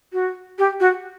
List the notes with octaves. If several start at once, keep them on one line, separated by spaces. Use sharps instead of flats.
F#4
G4
F#4